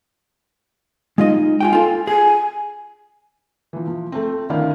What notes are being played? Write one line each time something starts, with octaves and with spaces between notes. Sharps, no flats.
G#3 D#4 F4 D#5
F4 F#4 G5 G#5
F4 A4
G#4 G#5
E3 F3
F3
A3 C4
D2 D#3 E4 D5 F5